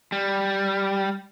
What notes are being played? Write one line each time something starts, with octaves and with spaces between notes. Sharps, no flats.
G3